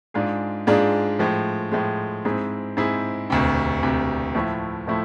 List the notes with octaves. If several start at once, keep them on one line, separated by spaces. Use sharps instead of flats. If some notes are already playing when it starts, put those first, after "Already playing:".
G#2 G#3 D4 F4 G#4
G#2 G#3 D4 F4 G#4
A2 F3 G#3
A2 F3 G#3
G#2 G#3 C4 E4 G#4
G#2 G#3 C4 E4 G#4
E1 D2 C3
E1 D2 C3
A2 F3 A3 E4
A2 F3 A3 E4